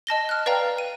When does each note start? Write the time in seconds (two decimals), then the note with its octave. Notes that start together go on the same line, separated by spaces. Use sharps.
0.07 D#5 A5 A#6 G7
0.29 F6 F#6
0.46 B4 D5 F5 G5 A#5
0.78 D#7